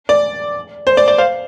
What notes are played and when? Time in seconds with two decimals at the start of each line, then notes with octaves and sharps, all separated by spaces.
0.09 D5
0.87 C5
0.97 D5
1.08 D5
1.18 C5 F5